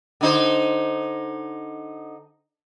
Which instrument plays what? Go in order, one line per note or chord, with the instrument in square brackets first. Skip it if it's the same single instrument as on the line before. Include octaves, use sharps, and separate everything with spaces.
[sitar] D3 D#4 C5